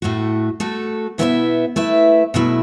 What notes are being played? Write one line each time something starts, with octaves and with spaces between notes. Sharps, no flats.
A2 A3 F#4
A3 F#4 A4
B2 B3 E4 B4 E5
A3 E4 B4 E5
B2 F#3 A3 E4